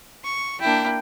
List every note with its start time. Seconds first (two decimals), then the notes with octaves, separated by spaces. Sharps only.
0.24 C#6
0.61 A#3 D4 E4 G5